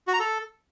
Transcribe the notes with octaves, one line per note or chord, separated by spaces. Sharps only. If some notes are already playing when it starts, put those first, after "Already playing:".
F#4
A#5
A4